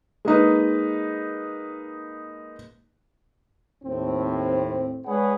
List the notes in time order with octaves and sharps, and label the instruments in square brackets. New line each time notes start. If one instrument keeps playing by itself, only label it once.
[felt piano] G#3 A#3 D#4 B4
[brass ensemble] D#2 A2 C4
G#3 D4 G#4 B4 C#5 F#5